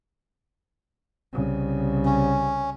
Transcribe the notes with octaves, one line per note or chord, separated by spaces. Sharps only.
C2 C#3
C#4